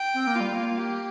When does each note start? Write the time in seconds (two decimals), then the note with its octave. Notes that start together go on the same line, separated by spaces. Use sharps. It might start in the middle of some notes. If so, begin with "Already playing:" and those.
Already playing: G5
0.14 C4
0.27 A#3
0.35 F4
0.40 G3
0.53 A#3
0.77 G4